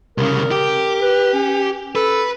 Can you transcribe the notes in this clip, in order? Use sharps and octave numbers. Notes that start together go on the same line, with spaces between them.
C2 C#3 A#4
G4
B4
C#4
A4 B4